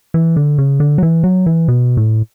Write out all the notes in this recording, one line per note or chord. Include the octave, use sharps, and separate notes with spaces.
E3
D3
C#3
D3
F#3
E3
F#3
E3
B2
A2